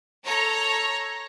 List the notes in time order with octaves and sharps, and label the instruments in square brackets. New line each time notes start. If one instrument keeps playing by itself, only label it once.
[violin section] A4 C#5 A#5